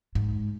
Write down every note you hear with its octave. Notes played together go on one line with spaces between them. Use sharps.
G#2